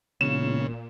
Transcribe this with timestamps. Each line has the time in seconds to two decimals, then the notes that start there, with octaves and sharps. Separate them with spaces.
0.21 E1 A#2 C#3 E7